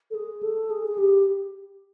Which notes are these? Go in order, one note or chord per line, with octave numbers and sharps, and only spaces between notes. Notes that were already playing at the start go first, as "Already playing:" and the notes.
A4
G#4
A4
G#4
G#4
G4